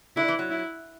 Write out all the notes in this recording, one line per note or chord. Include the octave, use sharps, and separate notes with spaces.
D3 E4
E3
F#3
E4